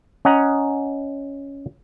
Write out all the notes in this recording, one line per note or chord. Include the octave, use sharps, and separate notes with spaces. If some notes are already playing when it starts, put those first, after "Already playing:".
C#4 D#5 F#5 A#5